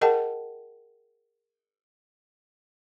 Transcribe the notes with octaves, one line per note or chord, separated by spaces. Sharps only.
G#4 A#4 D#5 F#5 G5 A5